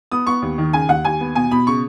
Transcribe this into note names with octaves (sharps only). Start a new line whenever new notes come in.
B3 D#6
B3 C#6
D#2
D#3
C#3 G#5
D#2 F#5
D#2 G#5
B3
B2 G#5
B2 B5
C#3 C#6